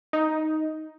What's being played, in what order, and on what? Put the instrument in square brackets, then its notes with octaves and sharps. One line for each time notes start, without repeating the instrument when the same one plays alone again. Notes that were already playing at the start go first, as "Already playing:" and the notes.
[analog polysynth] D#4